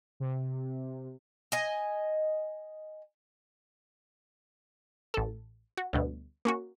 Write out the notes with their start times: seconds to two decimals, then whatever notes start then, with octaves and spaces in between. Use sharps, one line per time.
0.20 C3
1.52 D#5 G#5
5.14 A1 A4
5.77 F#4
5.93 D2 G2 B2
6.45 A#3 C#4 F#4